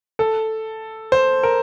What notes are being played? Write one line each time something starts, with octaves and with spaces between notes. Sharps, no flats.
A4
C5
A#4